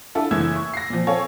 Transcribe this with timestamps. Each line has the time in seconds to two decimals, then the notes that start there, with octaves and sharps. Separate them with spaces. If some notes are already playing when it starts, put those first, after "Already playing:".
0.15 D4 E4 F4 A4
0.31 F#1 E3 A3 E6 G#6
0.56 C#6
0.74 A#6 C7
0.90 A#2 F3
1.07 C4 A4 C#5 F5 G#5